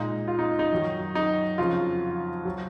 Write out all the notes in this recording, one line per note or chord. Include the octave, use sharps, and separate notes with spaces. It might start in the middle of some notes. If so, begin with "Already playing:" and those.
Already playing: A#2 G#3 D#4
F4
D#4
D#4
F#2 D#3 F#3
D#4
F2 C#3 F#3 F4
F#3